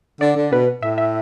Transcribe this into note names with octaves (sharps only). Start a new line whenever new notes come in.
D3 D5
D3
B2 B4
A2 E5
E5